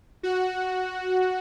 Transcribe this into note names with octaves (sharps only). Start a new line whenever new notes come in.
F#4